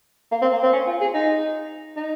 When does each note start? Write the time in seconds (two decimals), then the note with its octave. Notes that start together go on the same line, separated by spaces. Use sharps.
0.32 A#3
0.42 C4
0.53 A#3
0.63 C4
0.73 C#4
0.87 F4
1.01 G#4
1.14 D#4
1.96 D#4